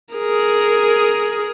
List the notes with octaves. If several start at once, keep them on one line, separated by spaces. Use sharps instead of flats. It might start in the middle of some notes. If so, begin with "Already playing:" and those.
G#4 A#4